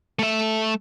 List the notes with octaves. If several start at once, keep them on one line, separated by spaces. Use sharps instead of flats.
A3 E5